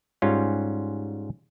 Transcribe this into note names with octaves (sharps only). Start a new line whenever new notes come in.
G#2 G3 C#4 F4